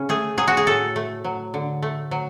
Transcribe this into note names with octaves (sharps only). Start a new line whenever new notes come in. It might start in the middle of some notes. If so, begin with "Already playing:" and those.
Already playing: C#3 C#4
A3 G#4
F#3 G#4
F#4
G#4
A2 A4
A3
F#3
D3
A3
F#3